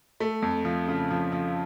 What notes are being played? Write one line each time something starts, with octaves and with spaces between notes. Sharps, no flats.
A3
F2
F3
C#3
F3
F3